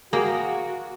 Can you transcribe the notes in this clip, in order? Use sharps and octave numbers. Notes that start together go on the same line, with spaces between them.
A#3 F#4 G#4 G5